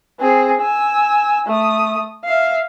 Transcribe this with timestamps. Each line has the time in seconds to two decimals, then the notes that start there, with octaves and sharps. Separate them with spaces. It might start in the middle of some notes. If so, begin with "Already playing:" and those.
0.20 C4 G#4
0.61 G#5 E6
1.47 A3 D#6
2.24 E5 F5